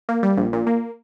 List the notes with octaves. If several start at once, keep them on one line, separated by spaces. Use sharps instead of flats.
A#3
G3
A#1
A#2
A#3